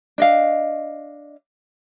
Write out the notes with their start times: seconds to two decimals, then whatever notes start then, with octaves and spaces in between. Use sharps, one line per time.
0.18 D4 D#5 F5